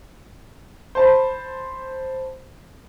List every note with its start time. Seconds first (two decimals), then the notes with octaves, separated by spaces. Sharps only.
0.95 C5 A5 B5